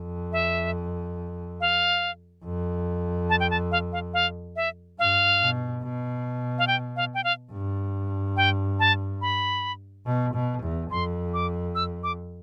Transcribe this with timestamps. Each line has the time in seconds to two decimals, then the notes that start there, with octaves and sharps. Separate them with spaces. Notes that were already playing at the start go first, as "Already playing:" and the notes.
Already playing: F2
0.32 E5
1.61 F5
2.45 F2
3.30 A5
3.40 G5
3.50 A5
3.72 F5
3.92 F5
4.14 F5
4.56 E5
4.99 G2 F5
5.41 B2
5.83 B2
6.58 F5
6.67 G5
6.96 F5
7.15 G5
7.24 F5
7.52 G2
8.37 G5
8.80 A5
9.21 B5
10.06 B2
10.34 B2
10.63 E2
10.91 F2 C6
11.34 D6
11.75 E6
12.03 D6